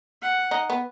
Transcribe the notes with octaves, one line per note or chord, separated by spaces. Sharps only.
F#5
D#4
B3